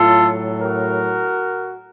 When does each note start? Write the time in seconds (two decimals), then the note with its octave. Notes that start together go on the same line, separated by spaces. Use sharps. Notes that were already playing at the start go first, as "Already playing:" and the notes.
Already playing: A2 F#3 F4 A4
0.62 F#4 A#4